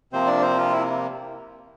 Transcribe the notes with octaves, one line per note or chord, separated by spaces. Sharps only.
C3 F3 A#3 C4 C5
D4 D5
C4 C5
F3 F4
E4